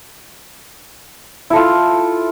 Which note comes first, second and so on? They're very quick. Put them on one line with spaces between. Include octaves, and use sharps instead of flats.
E4 A4 F4